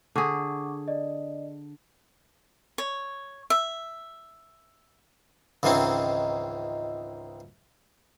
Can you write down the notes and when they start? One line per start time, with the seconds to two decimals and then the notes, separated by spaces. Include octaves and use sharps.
0.16 D3 G#4 F#5 C#6 D6
0.88 D5 D#5
2.78 C#5
3.50 E5
5.63 C#2 G#2 D#3 E3 C4 C#4